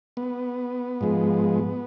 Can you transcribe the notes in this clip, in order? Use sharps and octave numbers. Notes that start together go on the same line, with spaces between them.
B3
G#2 F3 G#3